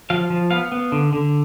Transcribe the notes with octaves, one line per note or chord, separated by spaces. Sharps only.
F3 F5
F3
B3 F5
B3
D3
D3